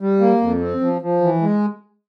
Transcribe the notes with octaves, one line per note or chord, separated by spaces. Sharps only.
G3
A#3
F2
C4
F3
F3
E3
G#3